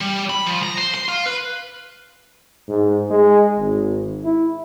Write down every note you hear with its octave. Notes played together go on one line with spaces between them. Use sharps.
G3
B5
F3
A#5
C5
C6
F4
B4
G#2
G#3
G#1
E4